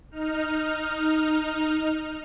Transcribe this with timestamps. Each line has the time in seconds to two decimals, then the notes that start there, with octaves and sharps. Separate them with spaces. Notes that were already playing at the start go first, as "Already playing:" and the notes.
0.11 D#4 F6